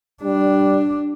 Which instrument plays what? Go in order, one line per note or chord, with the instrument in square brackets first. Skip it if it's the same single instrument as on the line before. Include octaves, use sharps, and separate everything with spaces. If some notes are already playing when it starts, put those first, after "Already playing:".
[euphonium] G3 [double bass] D4